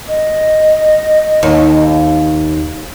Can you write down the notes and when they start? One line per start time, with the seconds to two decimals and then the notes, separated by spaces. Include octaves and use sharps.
0.08 D#5
1.43 D#2